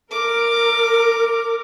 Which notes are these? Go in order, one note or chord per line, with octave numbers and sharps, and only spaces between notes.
A#4 D6